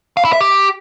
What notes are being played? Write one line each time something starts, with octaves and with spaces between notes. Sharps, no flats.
F5
E4
E5
G4